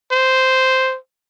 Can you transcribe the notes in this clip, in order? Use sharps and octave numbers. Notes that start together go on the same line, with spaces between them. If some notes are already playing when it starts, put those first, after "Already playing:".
C5